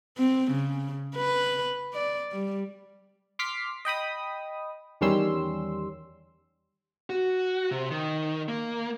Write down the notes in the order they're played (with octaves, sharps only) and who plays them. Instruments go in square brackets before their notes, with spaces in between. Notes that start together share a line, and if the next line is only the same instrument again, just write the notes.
[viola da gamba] C4
C#3
B4
D5
G3
[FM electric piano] C6 D6 F6 B6 C7
D#5 G5 B5 D#6
E2 D#3 G3 C#4 C6 E6
[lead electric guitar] F#4
C3
D#3
A#3